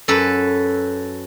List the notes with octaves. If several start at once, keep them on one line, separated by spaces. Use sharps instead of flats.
F#2 A4 B4